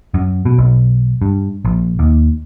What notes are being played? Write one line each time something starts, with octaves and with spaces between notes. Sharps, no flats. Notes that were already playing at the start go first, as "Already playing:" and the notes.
F#2
B2
B1
G2
A#1
D#2